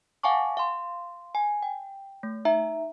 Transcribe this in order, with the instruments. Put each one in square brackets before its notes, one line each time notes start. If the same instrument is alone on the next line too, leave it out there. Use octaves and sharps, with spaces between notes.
[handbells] F5 F#5 G#5 A5 C#6 D6
F5 C6
G#5
G5
A3
D#4 E5 A#5